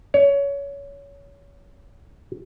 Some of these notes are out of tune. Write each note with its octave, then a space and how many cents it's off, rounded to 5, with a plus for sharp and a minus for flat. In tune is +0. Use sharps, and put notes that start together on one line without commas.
C#5 +25